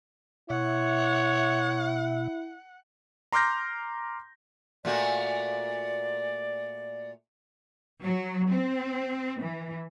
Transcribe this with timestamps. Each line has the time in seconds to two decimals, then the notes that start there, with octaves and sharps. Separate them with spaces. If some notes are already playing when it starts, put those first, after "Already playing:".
0.50 B2 E4 C#5 E5 F#5
3.33 A#5 C6 D6 F6 G6 A#6
4.85 A#2 A3 F#4 D5
8.03 F#3
8.52 C4
9.42 E3